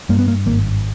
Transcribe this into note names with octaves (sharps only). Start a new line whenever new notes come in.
G2 A#3
B3
A#3
G#1 A#3